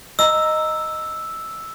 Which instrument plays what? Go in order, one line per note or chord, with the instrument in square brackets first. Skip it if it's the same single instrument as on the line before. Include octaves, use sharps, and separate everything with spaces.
[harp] D#5 A#5 [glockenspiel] E6